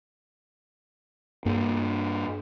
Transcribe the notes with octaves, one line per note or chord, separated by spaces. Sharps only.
G2 A#3